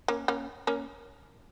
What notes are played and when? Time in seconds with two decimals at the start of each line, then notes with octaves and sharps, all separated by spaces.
0.08 A#3 C#4
0.28 A#3 C#4
0.67 A#3 C#4